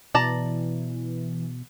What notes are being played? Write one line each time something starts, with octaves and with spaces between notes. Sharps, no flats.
B2 E3 D5 A5 A#5